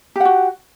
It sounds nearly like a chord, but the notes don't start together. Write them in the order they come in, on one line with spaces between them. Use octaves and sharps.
G4 F#5 F#4